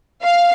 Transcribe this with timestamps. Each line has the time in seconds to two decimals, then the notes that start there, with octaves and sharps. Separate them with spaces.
0.23 F5